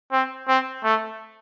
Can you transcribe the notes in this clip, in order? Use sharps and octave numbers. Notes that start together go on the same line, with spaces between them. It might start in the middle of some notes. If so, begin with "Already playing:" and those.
C4
C4
A3